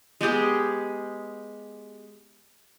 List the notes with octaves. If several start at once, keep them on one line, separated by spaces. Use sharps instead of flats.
G#3 B3 G4 G#4